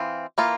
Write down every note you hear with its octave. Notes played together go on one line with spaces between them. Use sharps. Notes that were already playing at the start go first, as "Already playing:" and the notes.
Already playing: E3 C4 F4
E3 A#3 F4